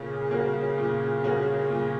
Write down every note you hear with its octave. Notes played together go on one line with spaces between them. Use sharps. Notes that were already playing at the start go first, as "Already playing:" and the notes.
Already playing: A#2 C#3 A#3
A#3 C#4 F#4
A#2
A#3 C#4 F#4
A#2